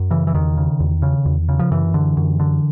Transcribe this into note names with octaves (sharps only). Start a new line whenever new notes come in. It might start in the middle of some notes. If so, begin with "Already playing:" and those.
Already playing: F#2
C#3 E3
E3
E2 D#3
C#3
E2
C#3
E2
C#3
F3
F#2 E3
D3
F#2
D3